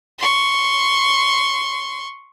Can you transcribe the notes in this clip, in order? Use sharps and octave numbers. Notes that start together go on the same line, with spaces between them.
C6 C#6